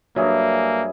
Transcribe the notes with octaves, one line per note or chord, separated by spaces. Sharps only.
G2 F#3 A#3 G#4 E5